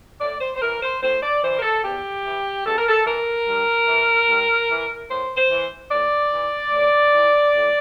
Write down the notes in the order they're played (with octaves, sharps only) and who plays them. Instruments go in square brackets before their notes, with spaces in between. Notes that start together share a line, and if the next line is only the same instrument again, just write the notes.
[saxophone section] A2 D5
C5
C5
E3 A#4
C5
A2 C5
D5
E3 C5
A#4
A4
E2 G4
E3
E2 A4
A#4
A4
E3 A#4
G2
E3
G2
E3
A2 C5
C5
E3
A2 D5
E3
A2
E3
A2